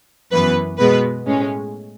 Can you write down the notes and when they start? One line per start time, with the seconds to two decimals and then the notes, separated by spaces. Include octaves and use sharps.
0.31 F#2 E3 B3 B4
0.79 B2 G#3 B3 B4
1.26 A2 G#3 C#4